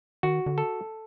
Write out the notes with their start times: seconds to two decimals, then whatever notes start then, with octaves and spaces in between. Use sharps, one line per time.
0.23 D#3 F#4
0.46 D3
0.58 A4